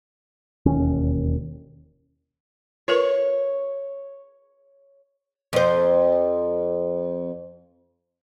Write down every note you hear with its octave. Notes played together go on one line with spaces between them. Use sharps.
E1 D#2 C#4
F4 A#4 B4 C#5
F2 C5